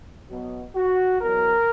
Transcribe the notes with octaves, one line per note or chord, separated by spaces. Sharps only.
B2 F#3 B3
F#4
E2 B2 F#3 A#4